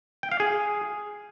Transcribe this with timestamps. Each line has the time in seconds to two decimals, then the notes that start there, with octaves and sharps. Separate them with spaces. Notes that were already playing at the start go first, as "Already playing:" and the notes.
0.23 G5
0.32 F5
0.40 G#4